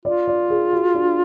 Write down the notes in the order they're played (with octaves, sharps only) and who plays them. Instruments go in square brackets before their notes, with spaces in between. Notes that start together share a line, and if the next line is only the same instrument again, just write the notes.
[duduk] F4 [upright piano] D5
[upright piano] D5
G#4
F#4
D4